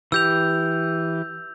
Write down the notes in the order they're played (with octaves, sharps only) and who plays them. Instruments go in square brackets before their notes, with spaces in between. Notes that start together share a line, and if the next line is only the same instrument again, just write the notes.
[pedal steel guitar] E3 G4 [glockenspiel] E6 G6 F7